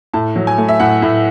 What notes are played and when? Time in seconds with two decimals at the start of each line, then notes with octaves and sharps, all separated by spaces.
0.13 A2 A5
0.36 F#3
0.47 G#5
0.58 A3
0.69 E5
0.80 A2 F#5
1.02 A2